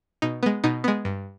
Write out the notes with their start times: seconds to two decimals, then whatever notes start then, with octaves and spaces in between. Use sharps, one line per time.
0.22 B2 D#4
0.43 G#3 B3
0.64 B2 D#4
0.84 G#3 B3
1.05 G2